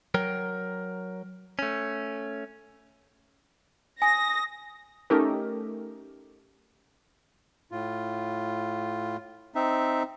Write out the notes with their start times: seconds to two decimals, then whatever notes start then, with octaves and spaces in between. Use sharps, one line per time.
0.14 F#3 A#4 G5
1.59 A3 C#4
4.02 G#5 D#6 A#6
5.10 A3 C#4 D#4 G4 A4 A#4
7.71 A2 F4
9.55 C4 D#4 E5